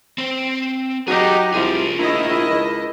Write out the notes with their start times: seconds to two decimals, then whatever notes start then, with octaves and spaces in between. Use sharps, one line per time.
0.18 C4 C5
1.08 F#3 D#4 G4 G#4 A#4
1.54 C2 F3 F4 G#4
1.98 A#1 D#3 E4 D#5
2.50 C#2